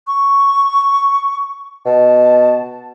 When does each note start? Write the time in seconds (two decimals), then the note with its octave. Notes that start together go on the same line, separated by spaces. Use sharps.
0.07 C#6
1.85 B2 A5